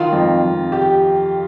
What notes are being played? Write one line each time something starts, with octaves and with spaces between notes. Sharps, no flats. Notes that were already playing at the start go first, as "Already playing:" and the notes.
Already playing: D#3 F4
F2
F2
G4